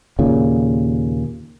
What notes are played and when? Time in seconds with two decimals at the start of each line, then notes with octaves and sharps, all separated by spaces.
0.19 D#2 A#2 C#3